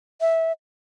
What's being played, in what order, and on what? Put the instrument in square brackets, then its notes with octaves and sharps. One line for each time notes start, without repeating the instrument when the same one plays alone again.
[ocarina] E5